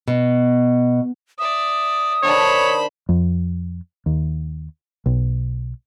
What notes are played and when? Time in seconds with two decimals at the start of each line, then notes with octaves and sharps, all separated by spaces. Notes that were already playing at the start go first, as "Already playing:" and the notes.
0.08 B2
1.38 D5 E5 D#6
2.23 D#3 D4 C5 C#5 A5 B5
3.09 F2
4.06 D#2
5.06 B1